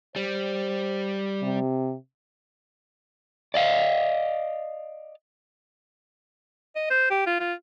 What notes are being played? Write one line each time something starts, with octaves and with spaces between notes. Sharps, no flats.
G3 C5
C3
D5 D#5 F5
D#5
C5
G4
F4
F4